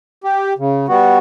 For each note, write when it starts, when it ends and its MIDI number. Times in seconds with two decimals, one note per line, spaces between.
0.24 0.53 67
0.58 0.86 49
0.88 1.18 55
0.88 1.18 59
0.88 1.18 66